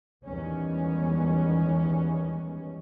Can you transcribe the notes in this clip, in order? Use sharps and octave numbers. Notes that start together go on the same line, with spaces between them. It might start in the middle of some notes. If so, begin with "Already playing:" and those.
E2 D#3 G3 G#3 B3 C#4